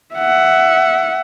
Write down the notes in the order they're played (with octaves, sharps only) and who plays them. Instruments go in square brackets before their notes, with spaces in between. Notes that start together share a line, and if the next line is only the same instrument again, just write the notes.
[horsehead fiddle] E5 F#5